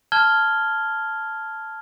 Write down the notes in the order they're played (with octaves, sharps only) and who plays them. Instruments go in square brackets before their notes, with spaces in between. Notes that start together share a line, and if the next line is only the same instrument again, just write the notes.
[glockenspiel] A5 F6 G#6 G7